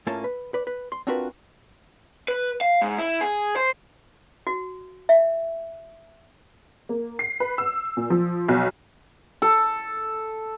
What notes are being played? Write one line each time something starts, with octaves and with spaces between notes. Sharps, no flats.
A2 A3 A#3 C#4 F4 A5
B4
B4 D5
B4
C6
C4 D4 F4 F#4 A#4 B4
B4
F5
G#2
E4
G#4
C5
F#4
E5
A#3
C7
B4
E6
A#2
F3
B1
A4